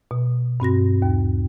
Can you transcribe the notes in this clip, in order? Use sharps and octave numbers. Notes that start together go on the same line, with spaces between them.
B2
G2 C4 F#4 A#6
D#2